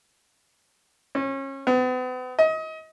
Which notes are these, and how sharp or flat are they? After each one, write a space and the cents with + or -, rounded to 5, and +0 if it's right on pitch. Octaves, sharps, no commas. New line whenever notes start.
C#4 -30
B3 +40
D#5 +30